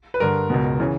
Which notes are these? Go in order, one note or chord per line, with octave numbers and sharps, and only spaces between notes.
B4
G2 D3 A#4
C#2 B2
C#3 E3